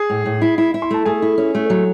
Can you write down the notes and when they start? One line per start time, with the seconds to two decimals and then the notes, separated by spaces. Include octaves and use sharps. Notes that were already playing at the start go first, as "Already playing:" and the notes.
Already playing: G#4
0.10 A2
0.26 A2
0.42 E4
0.58 E4
0.74 E4
0.82 C6
0.91 A3 A5
1.05 A3 G#4 G#5
1.22 E4
1.38 C#4
1.55 A3
1.70 F#3